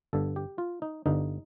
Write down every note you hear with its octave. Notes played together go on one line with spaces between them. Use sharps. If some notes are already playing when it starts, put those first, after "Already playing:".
G1 G2 D3 A4
G4
F4
D#4
G1 G2 D3 D#4